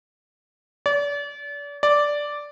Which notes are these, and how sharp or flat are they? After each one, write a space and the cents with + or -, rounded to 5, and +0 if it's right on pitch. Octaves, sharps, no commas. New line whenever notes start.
D5 -35
D5 -5